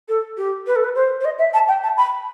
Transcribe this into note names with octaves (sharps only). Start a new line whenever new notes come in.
A4
G4
B4
A4
B4
C5
C5
D#5
E5
A5
G5
A5
B5